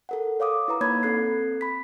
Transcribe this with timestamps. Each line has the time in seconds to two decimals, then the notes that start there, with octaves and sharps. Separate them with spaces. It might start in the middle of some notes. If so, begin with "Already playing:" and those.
0.09 A4 A#4 F#5
0.40 C#5 F5 D6 D#6
0.68 E4 B4 A#5
0.81 A#3 D#4 C#5 B5 G#6
1.03 C4 A4 F#6 C7
1.61 B5 B6